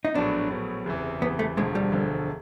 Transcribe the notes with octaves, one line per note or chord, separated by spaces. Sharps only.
D#4
A#1 A2 F#3 B3 D4
A#1 A2 F#3 B3
F#1 E2 C3 E3
F#1 E2 C3 E3 B3
A3
E1 D2 D3 F3 G#3
G3
E1 D2 D3 F3